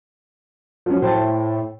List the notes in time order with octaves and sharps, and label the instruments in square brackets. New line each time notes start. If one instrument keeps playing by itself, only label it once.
[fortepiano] F3 F#3 C#4
[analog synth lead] A2 [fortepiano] C5 G5 A5